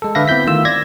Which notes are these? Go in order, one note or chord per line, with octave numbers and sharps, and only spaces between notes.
G#3 A4
D3 B4 E5 F5 A#6
B3 C4 E4 G6 B6
D#3 A3 F4 E6
D5 G#6 A#6